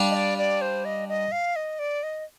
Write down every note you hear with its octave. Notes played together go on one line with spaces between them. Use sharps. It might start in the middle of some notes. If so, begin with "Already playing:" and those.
Already playing: G3 D4 F4
D#5
D5
D5
C5
D#5
D#5
F5
D#5
D5
D#5